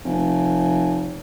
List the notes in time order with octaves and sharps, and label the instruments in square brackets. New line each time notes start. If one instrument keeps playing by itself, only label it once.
[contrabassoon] F1